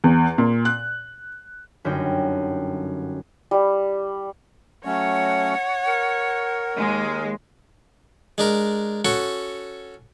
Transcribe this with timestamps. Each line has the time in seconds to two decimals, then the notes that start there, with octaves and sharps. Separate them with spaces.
0.04 E2
0.38 A#2
0.65 F#6
1.85 G1 F#2 D3 D#4 G5 C#7
3.51 G3
4.85 F#3 A3 C#4 C#5 F#5
5.87 A#4
6.77 D#2 G#3
8.38 G#3 D4 A#4
9.05 C#4 F#4 A4 F#5